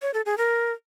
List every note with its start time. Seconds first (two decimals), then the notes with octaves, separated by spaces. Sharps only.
0.02 C#5
0.14 A4
0.26 G#4
0.38 A#4